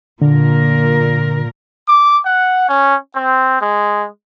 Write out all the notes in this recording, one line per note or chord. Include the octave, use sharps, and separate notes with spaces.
A#2 D3 A#4
D6
F#5
C#4
C4
G#3